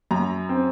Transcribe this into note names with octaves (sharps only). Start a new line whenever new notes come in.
F#2 A#5
C4